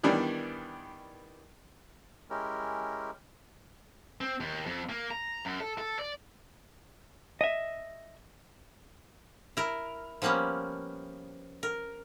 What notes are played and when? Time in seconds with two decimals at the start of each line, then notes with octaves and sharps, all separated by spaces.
0.03 D#3 E3 G3 B3 D4
2.30 G#3 C#4 E4 G4 A#4
4.21 C4
4.40 D#2
4.66 F2
4.89 A#3
5.11 A#5
5.45 F#2
5.60 A4
5.78 A4
5.99 D5
7.41 D#5 E5
9.57 E4 A#4
10.22 F3 G3 A#3 B3 C#4
11.63 A#4